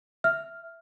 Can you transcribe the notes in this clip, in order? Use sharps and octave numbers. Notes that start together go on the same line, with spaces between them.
E5 F6